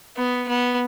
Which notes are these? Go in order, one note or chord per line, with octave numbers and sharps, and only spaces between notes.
B3
B3